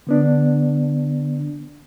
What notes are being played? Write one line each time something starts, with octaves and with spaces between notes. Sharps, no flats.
D3 B3 D4